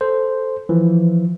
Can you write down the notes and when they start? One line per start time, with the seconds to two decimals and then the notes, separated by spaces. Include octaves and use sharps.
0.01 A4 C5
0.69 E3 F3